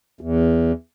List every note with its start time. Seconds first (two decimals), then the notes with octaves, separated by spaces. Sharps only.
0.21 E2